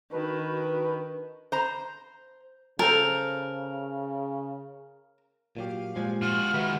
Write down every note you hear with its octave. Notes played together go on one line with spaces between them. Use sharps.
D#3 D4 F#4 B4
C5 A#5
C#3 A4 A#4 C5
A#2 F#3 G4 F5
A#2 F3 G#3 G4 G#5
F4 F#4 F6
D#3 G#3 F#4 B4 E5 F#5